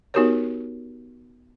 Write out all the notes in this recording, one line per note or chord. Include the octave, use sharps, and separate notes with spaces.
B3 D#4 F#4 G4 A#4 C#5